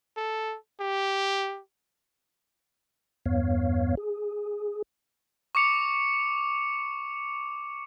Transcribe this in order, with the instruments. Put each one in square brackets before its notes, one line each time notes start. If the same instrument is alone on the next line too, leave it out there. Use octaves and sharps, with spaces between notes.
[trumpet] A4
G4
[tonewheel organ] E2 G2 B3 C#5 F5
G#4
[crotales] C#6 D6 C#7 F7